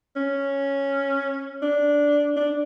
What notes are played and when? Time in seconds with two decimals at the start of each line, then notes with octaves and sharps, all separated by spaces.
0.16 C#4
1.62 D4
2.36 D4